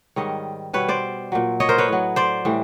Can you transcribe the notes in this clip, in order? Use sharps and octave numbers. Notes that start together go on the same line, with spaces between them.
G#2 D#3 G3 C#5 D#5
B2 G3 B4 C#5
C5 D5
A#2 F#3
C#5 D#5
A#4 C5
B4 C#5
A2 F#3
C5 D5
A2 E3 G3